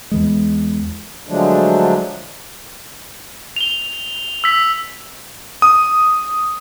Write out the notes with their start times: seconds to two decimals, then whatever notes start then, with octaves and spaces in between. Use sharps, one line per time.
0.11 E2 E3 G#3
1.28 D3 F3 F#3 G#3 A3 D4
3.56 F7 G7
4.44 E6 B6
5.62 D#6